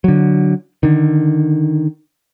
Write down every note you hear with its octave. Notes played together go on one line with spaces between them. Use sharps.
D3 F#3
D3 D#3